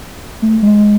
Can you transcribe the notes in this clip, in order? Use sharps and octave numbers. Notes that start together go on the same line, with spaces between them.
A3
G#3